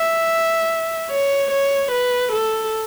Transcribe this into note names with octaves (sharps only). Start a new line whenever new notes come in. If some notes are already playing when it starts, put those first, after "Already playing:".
Already playing: E5
C#5
C#5
B4
A4